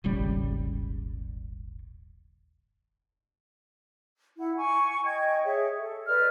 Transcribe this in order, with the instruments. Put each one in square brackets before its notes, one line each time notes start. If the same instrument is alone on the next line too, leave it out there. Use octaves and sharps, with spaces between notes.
[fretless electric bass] D#1 G#1 C#3 G3
[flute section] E4 F#5
G#5 C#6
D#5 G5 G#6
G#4 C#5 E5
A4
B4 D5 D#5 F6